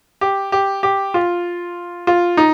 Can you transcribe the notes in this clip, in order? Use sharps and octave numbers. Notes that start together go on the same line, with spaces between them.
G4
G4
G4
F4
F4
D#4